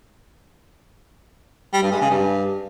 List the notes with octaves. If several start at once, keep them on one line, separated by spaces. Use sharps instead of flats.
G3
G2
G#3
C#3
G2